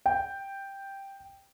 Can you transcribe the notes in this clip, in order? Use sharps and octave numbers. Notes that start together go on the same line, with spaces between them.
G5